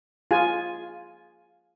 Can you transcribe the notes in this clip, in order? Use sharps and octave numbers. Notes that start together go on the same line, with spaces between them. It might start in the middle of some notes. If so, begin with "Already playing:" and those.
F4 G#4 G#5